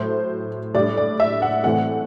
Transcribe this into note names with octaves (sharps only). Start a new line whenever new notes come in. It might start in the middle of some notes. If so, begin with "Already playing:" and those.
Already playing: A2 F#3 A3 C5
A2 G3 D4 D5
D5
E5
F#5
A2 E3 A3 C4 F#5